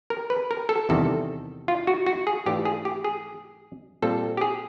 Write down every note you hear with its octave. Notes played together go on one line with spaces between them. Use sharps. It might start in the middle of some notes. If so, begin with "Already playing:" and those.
A#4
B4
A#4
A4
E2 C3 D#3 G3 C4 A4
F4
F#4
F#4
G#4
G#2 E3 A3 D4 F4 G4
G#4
G4
G#4
A#2 G3 C4 F4 A4
G4
G#4